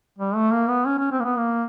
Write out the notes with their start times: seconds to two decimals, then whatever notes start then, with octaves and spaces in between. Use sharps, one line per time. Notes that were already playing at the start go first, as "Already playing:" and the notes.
0.19 G3
0.35 A3
0.53 A#3
0.69 B3
0.86 C#4
0.99 C#4
1.12 C4
1.20 A#3
1.25 B3
1.37 A#3